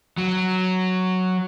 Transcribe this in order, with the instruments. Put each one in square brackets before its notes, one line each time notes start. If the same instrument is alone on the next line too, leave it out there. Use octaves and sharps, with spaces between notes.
[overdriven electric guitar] F#3